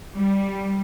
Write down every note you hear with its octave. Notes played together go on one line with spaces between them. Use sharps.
G3